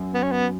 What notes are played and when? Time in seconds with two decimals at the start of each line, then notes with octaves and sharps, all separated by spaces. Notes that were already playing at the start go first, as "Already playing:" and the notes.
Already playing: F#2
0.14 B3
0.23 C#4
0.31 B3